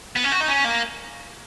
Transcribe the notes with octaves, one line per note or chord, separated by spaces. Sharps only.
B3
C#4
F#4
D#4
C#4
A#3